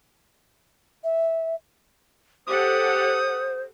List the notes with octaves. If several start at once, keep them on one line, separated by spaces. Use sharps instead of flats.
E5
G4 A4 C5 F#5 D#6